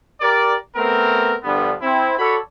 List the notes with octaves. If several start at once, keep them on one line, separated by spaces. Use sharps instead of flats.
G4 A#4 D5
A3 B3 C4 A#4
G2 D3 F3 B3
C4 E4
F#4 A4 C#5 D5 B5